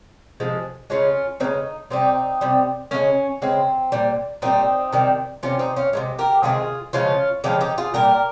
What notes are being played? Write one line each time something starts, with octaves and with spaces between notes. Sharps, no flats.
C3 F3 G#3
C#3 G#3 C#4 F4
C#3 G#3 C4 D#4
C3 G3 C4 D#4
C3 G3
C#3 G#3 A#3 C#4
C#3 G#3 C4
A#2 G3
A#2 G3 C4 D#4
C3 D#3 G3
C3 D#3 G3 C#4 F4
C4 D#4
C#4 F4
C3 D#3 G#3
G4 A#4
C3 D#3 G#3 F4 G#4
C#3 F3 G#3 C#4 F4
C#3 F3 G#3 D#4 G4
D#4 G4
F4 G#4
A#2 G3 G4 A#4